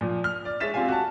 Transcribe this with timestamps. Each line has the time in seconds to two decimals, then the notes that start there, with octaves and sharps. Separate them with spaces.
0.01 A#2 F3
0.24 F6
0.45 D5
0.60 G#3 C#5 E5 A6 B6 E7
0.74 C4 F4 G4 F5 G#5
0.88 F#4 A5